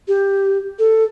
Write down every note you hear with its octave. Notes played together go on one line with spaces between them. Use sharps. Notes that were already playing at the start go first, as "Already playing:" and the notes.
G4
A4